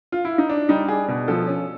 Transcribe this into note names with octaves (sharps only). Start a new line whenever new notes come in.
F4
E4
D#4
D4
G3 D#4
D4 G#4
B2
F3 A4
C#4